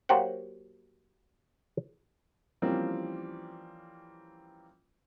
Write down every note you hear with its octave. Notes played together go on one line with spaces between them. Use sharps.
F#3 A#3 F#4 G4 C5 F#5
E3 F3 G3 A#3 C4 C#4